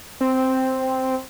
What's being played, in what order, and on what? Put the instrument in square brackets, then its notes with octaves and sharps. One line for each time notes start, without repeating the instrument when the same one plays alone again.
[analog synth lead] C4